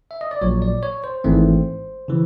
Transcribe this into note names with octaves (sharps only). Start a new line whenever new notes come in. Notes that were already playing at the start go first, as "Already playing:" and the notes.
E5
D#5
D5
A#1 A#2 F#3 C#5
D5
C#5
C5
G#1 G#2 E3 A3 C4
C#3 E3